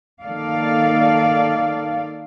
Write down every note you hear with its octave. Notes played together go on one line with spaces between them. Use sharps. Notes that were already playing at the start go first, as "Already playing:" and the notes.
D#3 A#3 A4 D5 F5